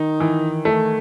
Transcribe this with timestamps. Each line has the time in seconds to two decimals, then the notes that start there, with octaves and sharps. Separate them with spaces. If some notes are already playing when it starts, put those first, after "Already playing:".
Already playing: D#3 D#4
0.20 E3
0.65 D#3 A3